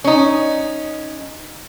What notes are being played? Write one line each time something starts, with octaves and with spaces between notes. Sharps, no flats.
C#4 D#4